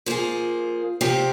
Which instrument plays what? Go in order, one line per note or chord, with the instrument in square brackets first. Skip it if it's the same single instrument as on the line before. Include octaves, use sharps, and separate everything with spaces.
[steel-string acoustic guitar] F3 A#3 F4 G#4
C3 F3 C4 G4